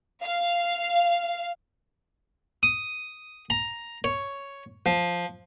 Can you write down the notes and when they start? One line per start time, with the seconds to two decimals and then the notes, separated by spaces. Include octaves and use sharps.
0.23 F5
2.63 D#6
3.50 A#5
4.04 C#5
4.86 F3